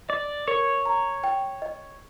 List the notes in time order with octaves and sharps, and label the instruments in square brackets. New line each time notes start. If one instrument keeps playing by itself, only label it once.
[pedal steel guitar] D5 [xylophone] D#5
[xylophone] A#4 [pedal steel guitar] C#5
[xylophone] A#5
G5
D#5